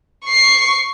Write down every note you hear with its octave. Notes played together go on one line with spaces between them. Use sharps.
C#6 C7